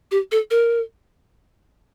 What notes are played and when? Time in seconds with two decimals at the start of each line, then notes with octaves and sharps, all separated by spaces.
0.11 G4
0.32 A4
0.51 A#4